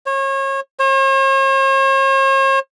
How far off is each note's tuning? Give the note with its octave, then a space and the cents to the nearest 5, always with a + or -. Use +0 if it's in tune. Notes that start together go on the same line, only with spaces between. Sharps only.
C#5 -35
C#5 -45